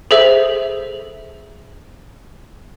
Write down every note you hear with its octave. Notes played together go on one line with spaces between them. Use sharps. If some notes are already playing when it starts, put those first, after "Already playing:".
G#4 A4 C5 E5